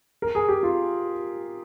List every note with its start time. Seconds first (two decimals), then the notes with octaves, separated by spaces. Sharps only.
0.22 A#4
0.35 G#4
0.48 G4
0.63 F4